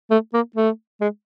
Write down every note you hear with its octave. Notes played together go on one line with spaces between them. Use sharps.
A3
A#3
A3
G#3